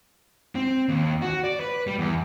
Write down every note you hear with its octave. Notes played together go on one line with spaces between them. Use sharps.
C4
D#2
F#4
D5
B4
G3
E2